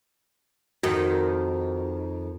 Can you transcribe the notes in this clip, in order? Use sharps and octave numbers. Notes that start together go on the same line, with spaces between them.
F2 D#3 F#4